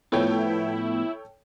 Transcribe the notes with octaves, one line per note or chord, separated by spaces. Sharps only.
A2 F3 B3 E4 A4 C#5 G5